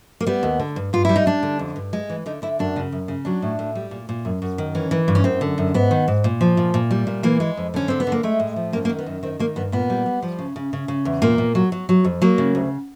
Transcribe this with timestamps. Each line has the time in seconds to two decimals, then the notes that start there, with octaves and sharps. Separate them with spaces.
0.21 A#3
0.27 G3 B3
0.43 D#2
0.60 D3
0.76 G2
0.93 G2 F4
1.05 G3 E4
1.16 D#4
1.26 G3 D4
1.43 D3
1.59 F2
1.76 G2
1.93 G#3
2.10 E3
2.26 D3 D#4
2.42 D3 E4
2.59 F#2 D4
2.76 C#3
2.92 F#2
3.08 C#3
3.25 F#3 D4
3.42 A2
3.59 A2
3.75 G3
3.91 A#2
4.09 A#2
4.25 F#2
4.42 F#2
4.58 D#3
4.75 E3 C#4
4.91 E3
5.08 G2
5.15 C#4
5.24 F#2 C4
5.41 D3
5.58 F#2
5.74 G#2 B3
5.91 D#3
6.08 G#2
6.24 A#2
6.41 F3
6.57 A#2
6.74 A#2
6.91 G3
7.07 A#2
7.23 E3 A#3
7.40 G#3
7.57 F2
7.74 D3 C#4
7.88 D3 C4
8.00 B3
8.07 D3
8.12 A#3
8.23 G#3 A3
8.40 A2
8.56 F3
8.73 F#2 A#3
8.85 A#3
8.89 D#3
8.99 B3
9.06 F#2
9.23 D#3 C4
9.39 D#3 A#3
9.56 G2 B3
9.72 A#2 B3
9.90 G3
10.06 G3
10.22 F3
10.39 C#3
10.56 C#3
10.73 C#3
10.88 C#3
11.05 E2
11.22 A#2 A#3
11.38 A#2
11.55 F#3
11.72 F#3
11.89 F#3
12.04 F2
12.22 F#3 A#3
12.38 C#3
12.55 D2